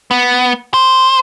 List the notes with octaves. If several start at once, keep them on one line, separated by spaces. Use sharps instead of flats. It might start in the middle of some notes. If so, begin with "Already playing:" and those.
B3
C5